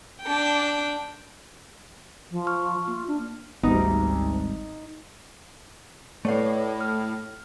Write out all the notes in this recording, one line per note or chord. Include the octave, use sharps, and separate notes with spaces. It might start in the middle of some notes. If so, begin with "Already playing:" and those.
D4 G5
F3
C#6 F6
A#3 F4 F6
D4
G#1 D2 G3 B3 D#4
A2 A3 B4 C#5 D5 F5
F6